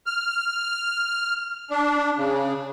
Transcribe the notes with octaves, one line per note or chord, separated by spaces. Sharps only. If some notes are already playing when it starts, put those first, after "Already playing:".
F6
D4
C#3